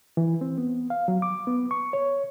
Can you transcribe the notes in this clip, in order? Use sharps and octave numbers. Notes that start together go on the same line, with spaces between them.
E3
C4
B3
F5
F#3
D6
B3
C#6
C#5